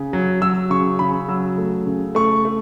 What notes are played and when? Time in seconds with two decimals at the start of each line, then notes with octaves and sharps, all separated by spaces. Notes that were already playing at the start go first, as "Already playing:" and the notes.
Already playing: C#3
0.13 F#3
0.41 F#3 E6
0.70 C#3 C#6
0.99 C#3 B5
1.28 F#3 E6
1.58 A3
1.86 C#3
2.15 A3 C#6
2.45 A3